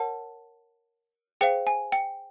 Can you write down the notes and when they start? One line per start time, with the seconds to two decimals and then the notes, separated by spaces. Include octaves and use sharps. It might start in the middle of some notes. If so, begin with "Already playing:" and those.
Already playing: A#4 C#5 F#5 A5
1.41 G#4 C5 F5 G5
1.67 G#5
1.92 G5